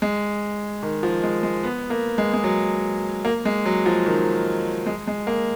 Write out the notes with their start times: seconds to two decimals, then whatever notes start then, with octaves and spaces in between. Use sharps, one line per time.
0.02 G#3
0.83 D#3
1.03 F3
1.23 G#3
1.43 G#3
1.63 B3
1.90 A#3
2.18 G#3
2.34 G#3
2.44 F#3
3.25 A#3
3.45 G#3
3.66 F#3
3.86 F3
4.06 D#3
4.86 G#3
5.07 G#3
5.27 A#3